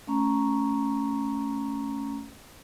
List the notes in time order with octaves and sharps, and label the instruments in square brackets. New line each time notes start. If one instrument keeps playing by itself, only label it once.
[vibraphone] A3 C#4 A#5 C#6